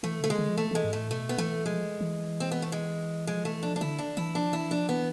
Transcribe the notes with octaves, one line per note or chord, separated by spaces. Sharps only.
E3 A3
D3 A3
G#3
D3
F3
E3 A3
E3 G#3
G#2
A2 A3
B2 A3
B3
E3 A3
F3 G#3
E3
C4
B3
A3
G#3
F3 G#3
E3 A3
F3 D4
D4
D3 E4
D4
E3 E4
F3 D4
E3 E4
F3 D4
E3 B3